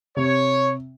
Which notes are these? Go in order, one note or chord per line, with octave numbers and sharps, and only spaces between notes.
C3 C#5